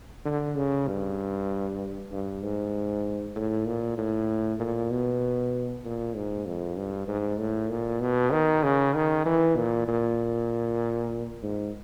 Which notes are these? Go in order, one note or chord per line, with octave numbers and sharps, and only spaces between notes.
D3
C#3
G2
G2
G#2
A2
A#2
A2
A#2
B2
A#2
G#2
F2
G2
G#2
A2
A#2
B2
D#3
C#3
D#3
E3
A#2
A#2
G#2